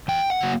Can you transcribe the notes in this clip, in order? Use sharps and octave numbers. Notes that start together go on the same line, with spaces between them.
E2 G5
F#5
C#3 F#3 A#3